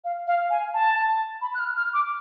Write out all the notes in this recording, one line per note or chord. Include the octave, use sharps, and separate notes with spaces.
F5
F5
G#5
A5
B5
F#6
F6
F6
D6